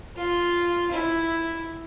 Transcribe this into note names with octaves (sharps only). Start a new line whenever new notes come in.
F4
E4